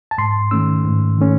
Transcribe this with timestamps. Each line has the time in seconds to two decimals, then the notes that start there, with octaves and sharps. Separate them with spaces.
0.11 A5
0.18 G#2 C6
0.51 D#3 A3 C#4 E6
0.85 G#2
1.18 D#3 A3 C#4